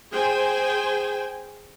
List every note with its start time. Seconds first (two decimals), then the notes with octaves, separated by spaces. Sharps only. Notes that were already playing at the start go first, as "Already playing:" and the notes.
0.12 G#4 C5 G5 G#5